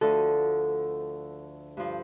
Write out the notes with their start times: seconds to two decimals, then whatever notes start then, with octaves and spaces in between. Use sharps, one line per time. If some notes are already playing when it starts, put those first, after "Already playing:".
0.01 D2 D3 F3 A4
1.77 G2 F3